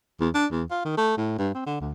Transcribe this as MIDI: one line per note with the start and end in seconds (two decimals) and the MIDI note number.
0.21 0.29 40
0.35 0.46 62
0.52 0.63 40
0.71 0.85 65
0.85 0.95 51
0.97 1.15 57
1.18 1.38 45
1.38 1.51 43
1.55 1.64 60
1.67 1.76 50
1.81 1.93 38